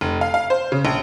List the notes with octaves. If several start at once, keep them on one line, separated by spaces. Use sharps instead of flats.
F1
F5
F5
C5
C#3
A#1